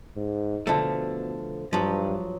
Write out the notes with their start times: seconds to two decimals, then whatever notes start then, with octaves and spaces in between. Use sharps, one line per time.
0.17 G#2
0.67 B2 D3 F3 A3
1.73 G2 F3 F#3